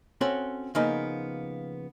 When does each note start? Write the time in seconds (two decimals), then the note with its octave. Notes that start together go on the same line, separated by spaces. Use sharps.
0.21 C4 C#4 F#4 A4
0.75 C#3 F3 A#3 B3 D#4